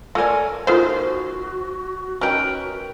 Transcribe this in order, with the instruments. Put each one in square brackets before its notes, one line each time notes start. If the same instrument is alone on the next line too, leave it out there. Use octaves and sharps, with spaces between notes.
[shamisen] A3 D5 [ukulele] A4 A#4 G#5
[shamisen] D#3 A3 B3 [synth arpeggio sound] F4 C5 [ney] F#4
[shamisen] C#4 D#4 [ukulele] A#4 B4 G5